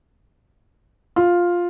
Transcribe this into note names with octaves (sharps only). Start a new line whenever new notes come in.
F4